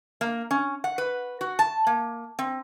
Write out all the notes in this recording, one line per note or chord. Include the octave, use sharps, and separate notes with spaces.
A#3
C#4
F#5
B4
F#4
A5
A#3
C4